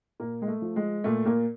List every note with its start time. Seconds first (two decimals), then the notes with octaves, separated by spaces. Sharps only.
0.20 A#2 A#3
0.42 G#3
0.48 A3
0.62 F3
0.76 G#3
1.04 A#2 A3
1.25 A#2 A#3